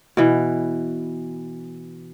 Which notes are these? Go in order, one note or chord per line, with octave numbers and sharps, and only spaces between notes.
B2 E3